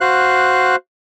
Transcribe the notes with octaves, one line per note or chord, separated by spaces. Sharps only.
F#4 C5 F5 F#6